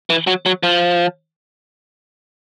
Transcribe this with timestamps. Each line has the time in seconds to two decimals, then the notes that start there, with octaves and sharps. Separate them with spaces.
0.10 E3
0.27 F#3
0.46 F#3
0.63 F3